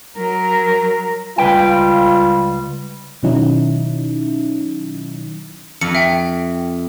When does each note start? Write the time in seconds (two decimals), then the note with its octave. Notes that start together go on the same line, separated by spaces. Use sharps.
0.17 F#3 A#4
1.38 C#2 G3 F4 B4 G5
3.23 B2 D#3 F#3 C#4 D#4 E4
5.81 F2 C#7
5.95 E5 G5